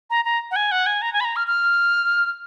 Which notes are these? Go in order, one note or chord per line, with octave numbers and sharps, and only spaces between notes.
A#5
A#5
F#5
G#5
F#5
G#5
A#5
G#5
B5
A#5
F6
F6